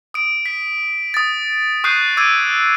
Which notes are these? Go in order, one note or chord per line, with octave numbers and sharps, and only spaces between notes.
D#6 D7
B6
D#6 A6
C#6 D#6 F#6 G6 C7 D#7
D6 E6 G#6 D7 D#7